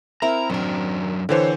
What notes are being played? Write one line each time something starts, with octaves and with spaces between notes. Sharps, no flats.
C4 E4 A#4 A#5
F#2 D#3 F#3 D4 A#4
D3 E3 C4 A4 C5 C#5